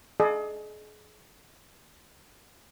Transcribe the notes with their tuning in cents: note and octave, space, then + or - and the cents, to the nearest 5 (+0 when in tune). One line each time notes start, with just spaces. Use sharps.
G#4 +35 D#5 -45